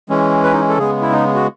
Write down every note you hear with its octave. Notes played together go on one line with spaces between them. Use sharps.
E3 G#3 C#4
B4
D#4
A4
C#3 G#3 B3 G#4
E4
D#4
F#4